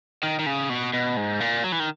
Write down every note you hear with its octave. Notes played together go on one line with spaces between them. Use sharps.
D#3
D#3
C#3
B2
B2
G#2
A#2
F#3
E3
D#3